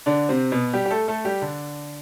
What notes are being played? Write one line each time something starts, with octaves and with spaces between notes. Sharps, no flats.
D3 D4
C3 C4
B2 B3
G3 G4
G4
A3 A4
A3 A4
G3 G4
D3 D4